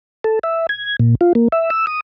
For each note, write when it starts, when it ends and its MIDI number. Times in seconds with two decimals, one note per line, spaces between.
0.24 0.39 69
0.43 0.67 76
0.69 0.96 92
0.99 1.15 46
1.21 1.33 65
1.35 1.48 58
1.52 1.70 76
1.70 1.86 88
1.87 2.00 87